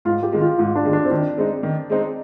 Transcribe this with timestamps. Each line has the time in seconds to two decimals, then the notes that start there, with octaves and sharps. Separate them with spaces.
0.05 G#2 F4
0.23 G4
0.32 D#3 G#3
0.41 F4
0.58 G#2 F4
0.75 D4
0.85 D#3 G#3
0.93 D4
1.04 C4
1.11 D#3 D4
1.38 G#3 C4 D#4
1.63 D#3
1.90 G#3 C4 D#4